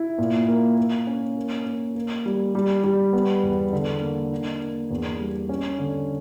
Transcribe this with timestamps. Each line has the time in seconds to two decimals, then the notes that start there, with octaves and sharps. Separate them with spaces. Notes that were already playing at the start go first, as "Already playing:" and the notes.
Already playing: E4
0.18 A#2
0.48 A#3
0.78 A#3
1.07 C#4
1.37 A#3
1.66 A#3
1.95 A#3
2.26 G3
2.55 G3
2.84 G3
3.13 B3
3.43 E2
3.73 D3
4.02 A#3
4.31 D4
4.62 A#3
4.91 E2
5.20 G3
5.49 C#4
5.79 D3